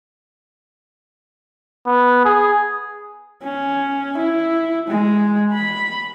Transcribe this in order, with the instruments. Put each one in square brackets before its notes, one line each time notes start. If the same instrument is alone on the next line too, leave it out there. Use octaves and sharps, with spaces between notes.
[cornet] B3
G#4
[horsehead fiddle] C#4
E4
G#3
B5